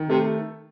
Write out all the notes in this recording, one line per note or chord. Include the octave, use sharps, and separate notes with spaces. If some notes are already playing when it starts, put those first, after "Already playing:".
Already playing: D#3
C3 A3